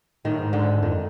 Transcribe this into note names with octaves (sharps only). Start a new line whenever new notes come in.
A2 D#3
G#2
D3
F2 D#3